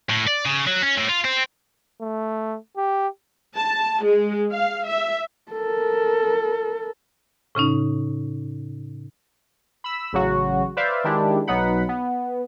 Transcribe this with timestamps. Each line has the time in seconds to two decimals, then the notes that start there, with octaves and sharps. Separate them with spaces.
0.10 A2
0.27 D5
0.45 C#3
0.67 F#3
0.82 C#4
0.97 A2
1.09 F4
1.24 C4
2.01 A3
2.77 G4
3.56 A5
4.04 G#3
4.52 F5
4.87 E5
5.52 A4 A#4
7.55 A2 C#3 C#4 D#4
9.84 B5 E6
10.13 A1 C#3 F#3 F#4
10.77 B4 C5 D5 E5 F5
11.04 D#3 G#3 D4 E4 G4
11.47 B1 F#3 B3 D#4 F#5 B5
11.89 B3